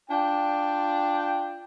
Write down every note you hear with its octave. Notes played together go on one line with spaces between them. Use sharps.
D4 F4 D5 G5